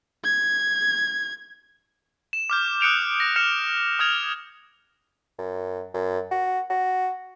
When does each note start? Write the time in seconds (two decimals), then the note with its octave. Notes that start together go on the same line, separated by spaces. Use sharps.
0.24 G#6
2.33 E7
2.50 D6 F6 G6
2.81 D#6 F#6 C#7 D7 F7
3.20 A#6 D7
3.36 F6 F#6 C#7 E7 F7
3.99 D#6 F6 G#6 F7
5.39 F#2
5.94 F#2
6.31 F#4
6.70 F#4